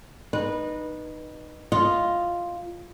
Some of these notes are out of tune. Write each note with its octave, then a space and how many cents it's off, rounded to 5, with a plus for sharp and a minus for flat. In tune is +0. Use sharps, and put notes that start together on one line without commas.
D#4 -20 B4 -15
F4 +0 D#5 +0